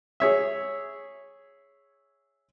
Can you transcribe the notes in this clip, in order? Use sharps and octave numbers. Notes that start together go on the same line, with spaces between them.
G#4 C#5 E5